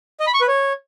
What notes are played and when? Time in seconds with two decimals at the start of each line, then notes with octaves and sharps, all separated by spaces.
0.20 D#5
0.27 B5
0.34 C#6
0.41 B4
0.48 C#5